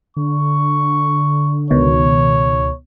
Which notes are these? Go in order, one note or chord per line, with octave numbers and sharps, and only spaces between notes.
D3 C#6
C#2 B2 D#3 C#5